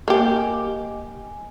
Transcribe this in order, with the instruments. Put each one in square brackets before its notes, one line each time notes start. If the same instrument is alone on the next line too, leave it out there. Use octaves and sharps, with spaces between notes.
[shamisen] A#3 G4 [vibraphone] D#5 G#5